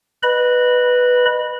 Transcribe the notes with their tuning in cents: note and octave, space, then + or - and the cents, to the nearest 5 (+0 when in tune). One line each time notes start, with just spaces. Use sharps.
B4 +0 D#5 -25 B5 -15